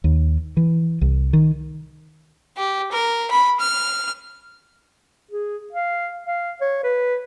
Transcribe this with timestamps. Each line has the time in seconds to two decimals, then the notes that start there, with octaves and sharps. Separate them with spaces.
0.04 D#2
0.57 E3
1.01 C2
1.33 D#3
2.57 G4
2.91 A#4
3.31 B5
3.60 F6
5.31 G#4
5.72 F5
6.26 F5
6.61 C#5
6.83 B4